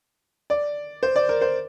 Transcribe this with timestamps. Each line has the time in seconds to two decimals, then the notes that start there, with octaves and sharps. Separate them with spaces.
0.50 D5
1.03 C5
1.16 D5
1.29 A#4
1.41 C5